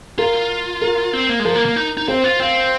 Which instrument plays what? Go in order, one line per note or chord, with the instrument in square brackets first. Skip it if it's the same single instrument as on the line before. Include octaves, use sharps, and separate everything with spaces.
[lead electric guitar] F4 [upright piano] A#4
[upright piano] A#4
[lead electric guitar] C4
A#3
G#3
[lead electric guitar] F3 [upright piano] A#4
[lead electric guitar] A#3
A#3
D#4
D#4
[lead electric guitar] C4 [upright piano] C5
[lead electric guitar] F4
[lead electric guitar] C4 [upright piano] F5